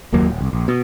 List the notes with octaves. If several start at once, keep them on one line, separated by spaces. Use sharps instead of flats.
F#1 D#2 F#3 A#3
D#1
C2
A#1
B2